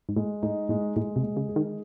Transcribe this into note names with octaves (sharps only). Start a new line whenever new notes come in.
G#2
A2 G#3
A2 D#4
A2 G#3
A2 G#3
C3
G#3
C#3
G#4
D#3